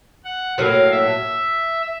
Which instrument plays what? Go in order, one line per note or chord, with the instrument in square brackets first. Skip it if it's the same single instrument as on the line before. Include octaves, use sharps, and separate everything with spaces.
[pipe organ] F#5
[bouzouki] A2 F#3 A#3 [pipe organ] F5
[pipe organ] E5